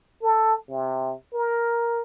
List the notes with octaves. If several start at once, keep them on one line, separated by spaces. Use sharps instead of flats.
A4
C3
A#4